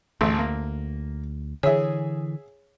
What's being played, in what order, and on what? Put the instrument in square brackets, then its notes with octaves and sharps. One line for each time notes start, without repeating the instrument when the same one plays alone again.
[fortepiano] A1 A3 [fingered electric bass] D2
[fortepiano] A#3
[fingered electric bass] D3 E3 [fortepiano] G#4 E5 [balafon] C#5